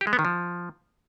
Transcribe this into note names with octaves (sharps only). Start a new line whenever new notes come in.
G4
G#3
B3
D#3
F3